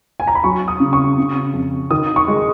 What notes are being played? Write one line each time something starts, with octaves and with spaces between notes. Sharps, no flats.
G#5
A#5
B5
F#3 C#6
D#6
C#3
C#6
C#3
F2
D#3 D#6
C#6
G#3